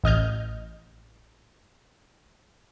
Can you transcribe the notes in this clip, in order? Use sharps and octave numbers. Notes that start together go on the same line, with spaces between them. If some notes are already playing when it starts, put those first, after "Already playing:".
A1 D#5 F6 G6